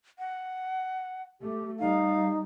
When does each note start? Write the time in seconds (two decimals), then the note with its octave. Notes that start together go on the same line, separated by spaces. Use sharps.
0.19 F#5
1.41 A3 G4
1.79 G3 D#4 F5